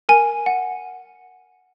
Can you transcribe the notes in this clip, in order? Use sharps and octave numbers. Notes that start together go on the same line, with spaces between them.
A#4 G#5
F#5